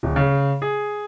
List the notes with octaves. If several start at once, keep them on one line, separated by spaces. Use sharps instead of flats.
D1
C#3
G#4